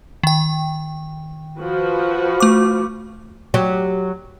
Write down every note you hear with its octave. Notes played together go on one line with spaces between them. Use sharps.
D#3 G5
F3 F#4 B4
A3 D6
F#3 G4